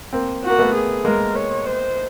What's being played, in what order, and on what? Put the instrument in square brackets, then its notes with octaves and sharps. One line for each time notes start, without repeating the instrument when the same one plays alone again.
[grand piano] A#3 C4
[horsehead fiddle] F#4
[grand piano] A#3
A3 B3
[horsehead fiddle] G#4
[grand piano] G#3 A#3 [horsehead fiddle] A#4
[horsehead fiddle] C#5
C5